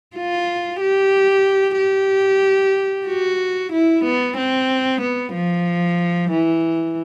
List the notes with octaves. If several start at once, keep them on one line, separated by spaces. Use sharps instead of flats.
F4
G4
G4
F#4
E4
B3
C4
B3
F3
E3